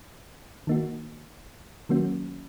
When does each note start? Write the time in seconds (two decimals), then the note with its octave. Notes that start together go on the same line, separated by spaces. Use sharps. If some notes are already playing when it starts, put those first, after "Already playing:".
0.67 D#3 A#3 D#4 F#4
1.89 D#3 F#3 A#3 C#4 F#4